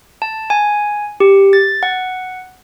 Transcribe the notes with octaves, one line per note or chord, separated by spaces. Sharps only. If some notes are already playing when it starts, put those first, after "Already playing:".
A5
G#5
G4
A6
F#5